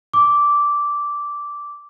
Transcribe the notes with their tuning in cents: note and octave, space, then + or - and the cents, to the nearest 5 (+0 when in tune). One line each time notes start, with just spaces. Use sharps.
D6 -10